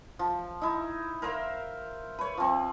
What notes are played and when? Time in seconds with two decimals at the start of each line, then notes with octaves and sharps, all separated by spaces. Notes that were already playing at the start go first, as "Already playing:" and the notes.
0.19 F3
0.62 D#4 E4
1.22 A#4 C5 E5 F5
2.18 B4 C#5
2.37 F3 C4